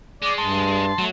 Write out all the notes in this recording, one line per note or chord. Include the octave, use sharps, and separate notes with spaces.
G#3 D5
G2 A5 C6
F#3 A3